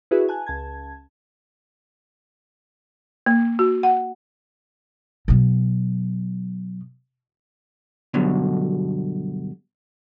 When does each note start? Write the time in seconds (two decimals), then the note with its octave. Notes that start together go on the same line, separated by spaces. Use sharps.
0.11 E4 F#4 G#4 B4 E5
0.28 G#5 A5 F#6
0.46 C#2 A5 G#6
3.26 A#3
3.59 F#4
3.83 F#5
5.28 B2 F#3
8.14 G2 B2 D3 F#3